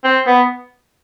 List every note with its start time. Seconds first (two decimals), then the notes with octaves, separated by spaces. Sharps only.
0.04 C4
0.27 B3